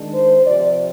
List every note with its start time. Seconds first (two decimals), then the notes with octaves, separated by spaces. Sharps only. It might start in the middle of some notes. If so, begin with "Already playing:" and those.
Already playing: D#3 G#3 D4
0.14 C5
0.45 C3 F3 C4 D5